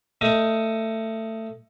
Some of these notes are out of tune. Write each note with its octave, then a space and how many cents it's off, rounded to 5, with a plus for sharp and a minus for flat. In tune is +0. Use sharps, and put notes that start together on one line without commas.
A3 +20 D#5 +15